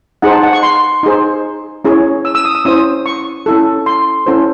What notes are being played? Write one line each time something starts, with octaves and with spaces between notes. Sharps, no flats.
D#4 G#4 C5 F#5
A5
F#5
C#6
C6
D#4 G#4 C5
C#4 E4 G#4 C#5
E6
E6
D#6
E6
C#4 E4 C5 D#6
C#6
C#4 E4 A4
C6
C#4 E4 A4 C5